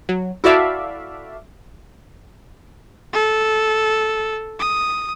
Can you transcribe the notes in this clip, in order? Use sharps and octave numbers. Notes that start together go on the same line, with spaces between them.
F#3
E4 F#4 A4 D5 E5 F5
A4
D#6